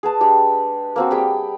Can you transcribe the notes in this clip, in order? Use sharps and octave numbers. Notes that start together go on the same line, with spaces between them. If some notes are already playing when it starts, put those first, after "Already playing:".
G#4 B4 A5
G#3 D4 G4
A#3 C4 F#4
G3 G#4 G5 B5